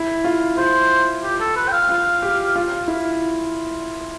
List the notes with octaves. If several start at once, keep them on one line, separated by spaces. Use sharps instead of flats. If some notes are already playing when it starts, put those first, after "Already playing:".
Already playing: E4
F4
F4 C5
G4
A4
B4
G5
F5
F4
G4
F4
E4